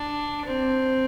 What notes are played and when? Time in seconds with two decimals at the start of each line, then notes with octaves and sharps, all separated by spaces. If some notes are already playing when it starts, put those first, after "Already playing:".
Already playing: D4
0.45 C4